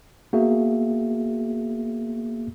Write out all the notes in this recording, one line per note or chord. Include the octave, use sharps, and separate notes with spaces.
A#3 B3 F#4 G#4 E5